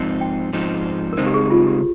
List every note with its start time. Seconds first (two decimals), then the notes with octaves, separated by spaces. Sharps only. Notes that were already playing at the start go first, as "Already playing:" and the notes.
Already playing: G#2 F3 C4 D#4
0.21 G5
0.53 G#2 F3 C4 D#4
1.13 A#4
1.17 C#3 G#3 C4 D#4 C5
1.27 G4
1.34 G#4
1.46 G4
1.50 F4
1.67 G4